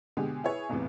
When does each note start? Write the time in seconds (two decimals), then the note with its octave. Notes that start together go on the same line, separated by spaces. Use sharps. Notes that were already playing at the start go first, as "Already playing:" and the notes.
0.17 B2 D3 G#3 G4 G#4
0.44 E4 G#4 B4 C#5
0.69 B1 E2 A2 C3 E3